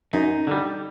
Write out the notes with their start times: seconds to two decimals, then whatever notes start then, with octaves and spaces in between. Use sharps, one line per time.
0.13 F#2 D#4
0.47 D3 G3